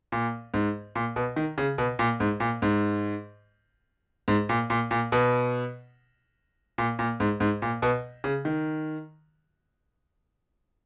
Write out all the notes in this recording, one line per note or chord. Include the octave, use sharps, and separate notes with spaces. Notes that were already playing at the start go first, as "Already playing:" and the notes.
A#2
G#2
A#2
B2
D#3
C#3
B2
A#2
G#2
A#2
G#2
G#2
A#2
A#2
A#2
B2
A#2
A#2
G#2
G#2
A#2
B2
C#3
D#3